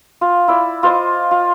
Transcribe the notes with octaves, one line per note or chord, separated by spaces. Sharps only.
F4
E4 D5
F4 C5 D#5 D6
F4